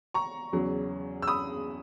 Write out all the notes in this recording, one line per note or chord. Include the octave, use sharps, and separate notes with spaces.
A#5 C#6
E2 C#3 F#3
E6
B5 D#6